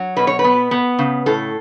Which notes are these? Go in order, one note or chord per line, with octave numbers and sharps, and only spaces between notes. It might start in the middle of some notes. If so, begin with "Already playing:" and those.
Already playing: F#3
B2 B4
C#5
B4
B3
B3
C#3
A2 A4